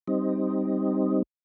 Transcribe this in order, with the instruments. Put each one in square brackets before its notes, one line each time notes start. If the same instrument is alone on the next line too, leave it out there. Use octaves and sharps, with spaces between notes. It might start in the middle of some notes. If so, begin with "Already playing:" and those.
[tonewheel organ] G3 C4 D#4